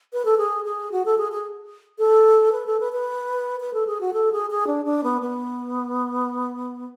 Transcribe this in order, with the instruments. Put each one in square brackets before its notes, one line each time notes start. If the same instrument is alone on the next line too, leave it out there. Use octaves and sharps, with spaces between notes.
[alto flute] B4
A4
G#4
G#4
F#4
A4
G#4
G#4
A4
B4
A4
B4
B4
B4
A4
G#4
F#4
A4
G#4
G#4
D4
D4
B3
B3